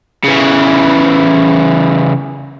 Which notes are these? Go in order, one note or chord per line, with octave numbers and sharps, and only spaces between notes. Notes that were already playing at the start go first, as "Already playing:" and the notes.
C#3 E3